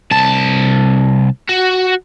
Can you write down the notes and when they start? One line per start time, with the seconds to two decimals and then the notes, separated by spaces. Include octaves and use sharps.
0.11 C2 A5
1.49 F#4